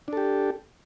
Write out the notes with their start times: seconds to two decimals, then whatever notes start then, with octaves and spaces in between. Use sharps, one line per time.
0.08 D4
0.13 A4
0.17 G4